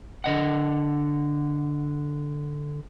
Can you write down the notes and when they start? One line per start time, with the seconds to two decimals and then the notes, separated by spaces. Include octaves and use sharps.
0.24 D3 D#5 F#5